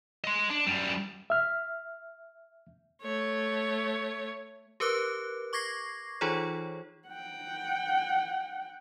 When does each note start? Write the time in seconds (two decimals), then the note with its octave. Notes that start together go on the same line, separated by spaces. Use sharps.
0.24 D#5 C6
0.50 D4
0.67 F#2 G3
1.30 E5 F6
3.03 A3 C#5
4.80 G4 A#4 B4 D6 F#6
5.53 C#6 D6 G#6 A#6 C7
6.21 E3 D#4 F4 G#4 C5 C#5
7.08 F#5 G5